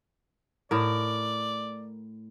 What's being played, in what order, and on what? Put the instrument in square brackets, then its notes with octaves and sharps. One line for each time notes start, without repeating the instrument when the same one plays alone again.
[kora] A2 A#4 [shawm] D5